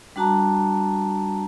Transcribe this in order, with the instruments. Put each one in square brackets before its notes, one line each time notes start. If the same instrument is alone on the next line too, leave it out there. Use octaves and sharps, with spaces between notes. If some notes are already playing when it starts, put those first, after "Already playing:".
[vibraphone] G3 D4 F#4 A5 A#5